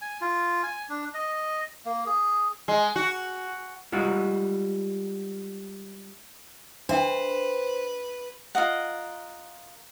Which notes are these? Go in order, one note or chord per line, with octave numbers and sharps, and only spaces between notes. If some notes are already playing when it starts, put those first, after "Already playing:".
G#5
F4
G#5
D4
D#5
A#3
G#4
G#3
F#4
G3 G#3 F4 F#4
D4 B4 C5 E5 G5
F4 A#4 D#5 F#5